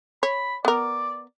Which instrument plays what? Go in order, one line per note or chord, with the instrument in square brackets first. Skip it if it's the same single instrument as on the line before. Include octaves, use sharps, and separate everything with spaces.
[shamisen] C#5 [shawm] B5
[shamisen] B3 A#4 [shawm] D5